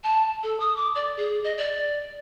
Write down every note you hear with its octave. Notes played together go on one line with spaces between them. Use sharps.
A5
A4
D#6
D6
D5
G#4
D#5
D5